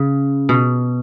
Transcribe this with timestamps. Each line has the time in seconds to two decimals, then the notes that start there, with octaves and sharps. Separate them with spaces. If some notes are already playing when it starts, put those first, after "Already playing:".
Already playing: C#3
0.49 B2